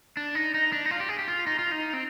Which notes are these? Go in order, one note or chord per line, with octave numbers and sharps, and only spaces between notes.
D4
D#4
D#4
D4
D#4
F4
G4
G#4
G4
F4
D#4
F4
D#4
C4